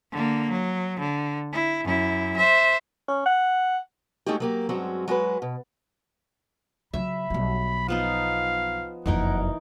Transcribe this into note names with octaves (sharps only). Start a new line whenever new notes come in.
D3 A#3
F#3
D3
E4
F#2 E4
C5 E5
C#4
F#5
G#3 A3 C#4 D#4 F#4 G4
F#3 A#3 G4
G2 F#3 G#3 C4 C#4 F#4
F#3 G#3 F#4 B4
B2
C#3 F#3 E5 B5
B1 G3
F3 B3 D#4 F5
F#1 F2 E3 D#4 A#4 F#5